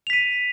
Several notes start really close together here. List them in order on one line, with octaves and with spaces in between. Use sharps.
F7 B6 D#7